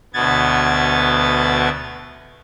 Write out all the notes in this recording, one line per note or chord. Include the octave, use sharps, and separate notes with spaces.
D2 B2 B3 G#6 A6